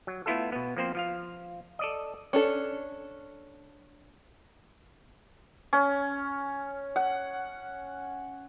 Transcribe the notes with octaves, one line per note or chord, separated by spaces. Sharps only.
F#3
A3 B3 E4 F4 A4
B2 B3
F3 A#3 C4 C5
F3 F4 F5
A4 D5 D#5
C#4 D4 A4
C#4
F#5